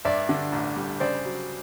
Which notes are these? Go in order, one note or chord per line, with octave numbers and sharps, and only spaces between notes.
G2 D5 E5
D3
A1
G3
C#3 C5 D5
F#3